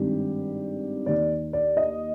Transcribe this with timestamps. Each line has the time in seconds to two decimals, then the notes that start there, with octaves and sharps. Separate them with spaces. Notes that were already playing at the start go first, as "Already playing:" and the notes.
Already playing: G#1 G2 D#3 G4
1.06 D#2 D#3 D5
1.53 D5
1.77 D#5